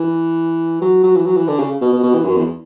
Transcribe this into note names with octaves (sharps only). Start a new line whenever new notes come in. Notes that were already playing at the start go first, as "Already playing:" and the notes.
Already playing: E3
F#3
F#3
E3
F#3
E3
D3
C#3
B2
B2
B2
E3
F#2
E2